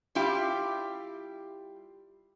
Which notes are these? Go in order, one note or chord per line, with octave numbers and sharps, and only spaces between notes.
G3 E4 F4 G4